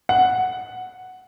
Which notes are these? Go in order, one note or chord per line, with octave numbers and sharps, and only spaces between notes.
F#5